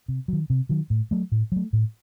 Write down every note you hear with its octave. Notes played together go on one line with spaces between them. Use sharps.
C3
D#3 F#3
C3
D#3 F#3
A2
F#3 A3
A2
F#3 A3
A2